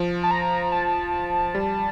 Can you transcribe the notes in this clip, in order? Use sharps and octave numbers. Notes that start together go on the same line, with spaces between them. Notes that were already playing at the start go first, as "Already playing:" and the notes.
Already playing: F3
A5
A#5
A5
G3